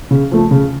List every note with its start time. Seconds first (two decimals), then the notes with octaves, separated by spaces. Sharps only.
0.11 C#3
0.31 F3 A3
0.51 C#3